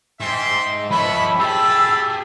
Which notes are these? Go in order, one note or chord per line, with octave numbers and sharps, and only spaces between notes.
G#2 E5 G5 C6
F3 B4 C#5 D#5 E5 B5
G4 G#4 E5 A5 B5 E6